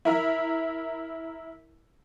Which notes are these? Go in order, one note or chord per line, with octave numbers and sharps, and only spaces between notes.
E4 A#4